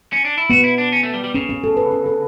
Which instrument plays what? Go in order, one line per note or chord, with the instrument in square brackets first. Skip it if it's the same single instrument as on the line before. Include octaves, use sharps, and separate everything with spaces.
[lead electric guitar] C#4
D4
E4
[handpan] B3 [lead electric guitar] F#4
[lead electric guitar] E4
D4
C#4
A3
G3
G3
[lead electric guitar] C#3 [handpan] C#4
[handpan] C#4
A4
B4
B4
A4